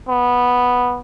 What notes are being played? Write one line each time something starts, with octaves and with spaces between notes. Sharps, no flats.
B3